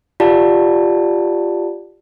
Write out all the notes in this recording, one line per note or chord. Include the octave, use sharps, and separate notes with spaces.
F4 G4 D5 F#5 A5